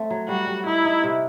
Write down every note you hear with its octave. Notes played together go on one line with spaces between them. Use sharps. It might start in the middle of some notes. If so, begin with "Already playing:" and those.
Already playing: A3 C4
F#3
G3 F#4
G3
D#4 E4
D#4
C3